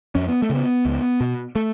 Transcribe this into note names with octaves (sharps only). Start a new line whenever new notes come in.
F2 C#4
B3
A3
C#3 B3
C#2
B2
A3